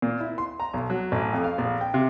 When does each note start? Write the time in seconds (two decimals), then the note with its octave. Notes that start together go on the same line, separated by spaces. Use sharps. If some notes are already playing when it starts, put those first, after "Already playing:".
0.02 A#2
0.20 E4
0.38 C6
0.60 A#5
0.74 B1
0.90 F#3
1.12 A1
1.33 F2
1.44 F5
1.58 A#1
1.81 G5
1.94 C3